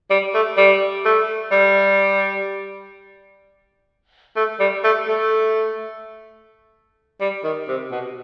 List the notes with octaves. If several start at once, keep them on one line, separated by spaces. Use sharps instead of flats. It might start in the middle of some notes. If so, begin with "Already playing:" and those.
G3
A3
G3
A3
G3
A3
G3
A3
A3
G3
D#3
C3
B2